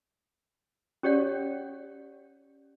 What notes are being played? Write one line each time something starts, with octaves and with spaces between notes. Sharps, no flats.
C#4 G4 C#5 D5 F#5